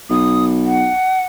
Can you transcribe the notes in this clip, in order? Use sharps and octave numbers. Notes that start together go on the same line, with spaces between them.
B1 D#6
F#5